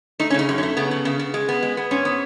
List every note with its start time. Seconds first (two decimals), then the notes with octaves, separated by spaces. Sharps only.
0.20 A3 D#4
0.30 C#4
0.34 C#3 D#4
0.49 F#2
0.58 C#4
0.63 A3
0.77 C#3 B3
0.91 C#3
1.05 C#3
1.19 C#3
1.34 G#3
1.49 B3
1.63 G#3
1.77 B3
1.91 G#2 C#4
2.05 B3